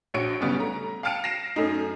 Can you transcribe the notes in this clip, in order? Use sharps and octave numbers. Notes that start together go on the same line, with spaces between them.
A#1 F#4 C#5 C#7 D7
C#3 G3 B3 C#4
A3 A#5
F5 G5 A5 F6 C#7 D7
A#6 C7 E7
F#2 A3 D#4